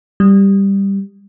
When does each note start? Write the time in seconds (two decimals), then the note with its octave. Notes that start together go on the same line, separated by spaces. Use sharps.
0.20 G3